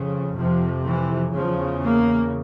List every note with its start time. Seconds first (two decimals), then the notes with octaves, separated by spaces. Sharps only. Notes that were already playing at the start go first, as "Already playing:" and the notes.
Already playing: F2 C#3
0.35 F2 C3 F3
0.84 E3
1.33 E2 C#3 F3
1.82 A#3